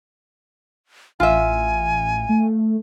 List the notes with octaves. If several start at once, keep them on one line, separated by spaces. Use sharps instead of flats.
A1 F4 E5 G#5
A3